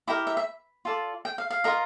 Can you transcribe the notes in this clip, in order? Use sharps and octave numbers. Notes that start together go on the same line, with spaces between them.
E4 G4 A#4 D#5
E5
E5
F4 A4 D5
G5
F5
F5
F4 A#4 D#5